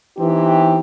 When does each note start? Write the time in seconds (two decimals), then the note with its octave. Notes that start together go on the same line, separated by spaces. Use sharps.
0.18 E3 B3 C4 D#4 G4